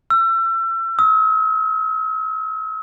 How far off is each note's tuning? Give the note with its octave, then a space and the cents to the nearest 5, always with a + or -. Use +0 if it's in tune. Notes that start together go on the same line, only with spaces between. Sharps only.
E6 +35
E6 -45